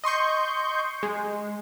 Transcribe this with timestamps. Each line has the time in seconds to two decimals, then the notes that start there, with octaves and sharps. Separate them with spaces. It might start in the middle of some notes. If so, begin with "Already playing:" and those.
0.04 D#5 C6 C#6 G6
1.03 G#3